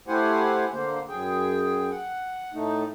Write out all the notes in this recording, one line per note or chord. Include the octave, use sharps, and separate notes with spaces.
A3 E4 G4 C5 F#5 G#5
D3 A#3 C5
F#2 G#4 G5
F#5
A2 A3 D#4